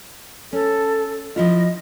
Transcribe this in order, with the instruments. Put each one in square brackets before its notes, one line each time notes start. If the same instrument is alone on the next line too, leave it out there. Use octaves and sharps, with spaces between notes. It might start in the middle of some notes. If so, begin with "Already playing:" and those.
[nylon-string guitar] C#4 [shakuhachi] A4
[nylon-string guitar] F3 E4 F4 [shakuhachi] D#5